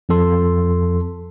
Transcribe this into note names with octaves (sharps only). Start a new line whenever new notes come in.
F2 F3 A4 C6